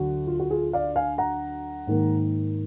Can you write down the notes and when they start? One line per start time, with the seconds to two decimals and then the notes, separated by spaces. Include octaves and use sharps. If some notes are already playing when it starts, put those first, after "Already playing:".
Already playing: D2 D3 F#3 F#4
0.27 F4
0.40 F#4
0.50 F4 G#4
0.73 D5 F5
0.96 F5 G#5
1.18 F#5 A#5
1.87 G#2 D#3 A#3